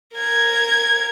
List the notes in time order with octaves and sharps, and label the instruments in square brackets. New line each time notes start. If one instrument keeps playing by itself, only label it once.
[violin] A#4 G#6